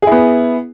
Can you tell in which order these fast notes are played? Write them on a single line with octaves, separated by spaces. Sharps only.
G#4 E4 B3